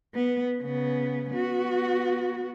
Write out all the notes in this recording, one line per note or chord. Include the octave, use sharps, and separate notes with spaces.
B3
C#3 B3
B3 F#4